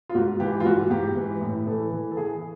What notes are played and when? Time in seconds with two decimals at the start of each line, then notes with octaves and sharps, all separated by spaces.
0.09 F4
0.15 G#2 F#4
0.40 E3 G4
0.60 F4
0.65 G#2 F#4
0.90 G#2 G4
1.16 E3
1.41 A2
1.66 E3 A4
1.92 E3
2.11 A4
2.17 E3 G#4